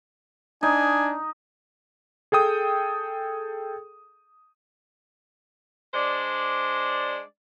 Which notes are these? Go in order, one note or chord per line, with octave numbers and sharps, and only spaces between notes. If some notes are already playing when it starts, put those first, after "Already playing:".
D4 D#4 G#5
G#4 A4 G5 D#6
G#3 D4 C5 D5